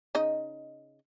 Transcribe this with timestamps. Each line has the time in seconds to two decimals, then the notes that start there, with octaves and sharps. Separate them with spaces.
0.15 C#3 D#4 D#5